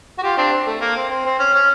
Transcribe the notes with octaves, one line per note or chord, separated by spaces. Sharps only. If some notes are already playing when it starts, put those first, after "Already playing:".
F#4
F4 G4
C4 D4
C4
A3
A#3
C4
C4
C4
C#4
C#4